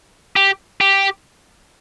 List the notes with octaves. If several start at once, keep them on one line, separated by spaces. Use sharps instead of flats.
G4
G4